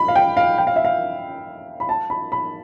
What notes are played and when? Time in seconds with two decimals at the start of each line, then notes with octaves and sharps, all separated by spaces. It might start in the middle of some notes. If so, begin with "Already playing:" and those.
Already playing: B5
0.08 F5
0.16 G5
0.37 F5
0.58 G5
0.67 F5
0.76 E5
0.85 F5
1.80 B5
1.89 A5
2.10 B5
2.32 B5